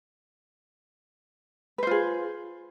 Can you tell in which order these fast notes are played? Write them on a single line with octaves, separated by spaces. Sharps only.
B4 C5 F4 G#4